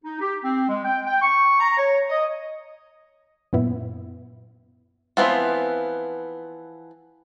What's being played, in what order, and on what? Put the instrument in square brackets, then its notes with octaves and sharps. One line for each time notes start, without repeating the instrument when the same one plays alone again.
[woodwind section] D#4
G4
C4
G#3
G5
G5
C#6
A#5
C#5
D#5
[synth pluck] F#2 A#2 B3 E4
[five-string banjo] E3 F3 B3 C4 F4